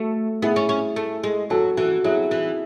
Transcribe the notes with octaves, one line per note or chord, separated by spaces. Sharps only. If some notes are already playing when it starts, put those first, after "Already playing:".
Already playing: A3 F#4
B3 E4 G#4
C#4
C#4
A3
G#3
F#3 F#4 A4
E3 F#4 A4
F#3 E4 G#4
E3